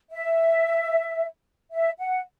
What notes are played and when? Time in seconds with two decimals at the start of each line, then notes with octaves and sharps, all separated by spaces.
0.11 E5
1.72 E5
2.00 F#5